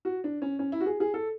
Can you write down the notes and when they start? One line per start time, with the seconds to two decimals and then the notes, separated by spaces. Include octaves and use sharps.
0.05 F#4
0.24 D4
0.42 C#4
0.59 C#4
0.72 E4
0.80 F#4
0.86 G#4
1.00 G#4
1.14 A4